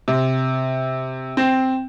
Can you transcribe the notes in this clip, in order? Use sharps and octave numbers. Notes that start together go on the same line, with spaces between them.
C3
C4